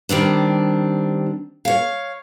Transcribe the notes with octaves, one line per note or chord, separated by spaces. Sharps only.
D#3 G3 C4 D4
C#5 F5